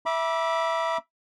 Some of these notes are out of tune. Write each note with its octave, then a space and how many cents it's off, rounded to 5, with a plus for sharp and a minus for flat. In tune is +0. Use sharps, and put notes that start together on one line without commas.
E5 +0 B5 -30 D6 +0